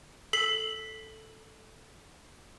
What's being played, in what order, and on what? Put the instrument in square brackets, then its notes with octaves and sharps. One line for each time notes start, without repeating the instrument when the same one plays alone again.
[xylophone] A4 B6 C7 F#7